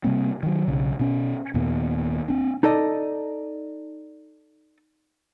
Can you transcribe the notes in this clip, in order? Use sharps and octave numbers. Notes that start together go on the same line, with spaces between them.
C3 G3 A#3 C4
D#3 F#3
B1 C#3
B2 C#4
D#2 A#2 B3
C4 D4
D#4 A4 D5 D#5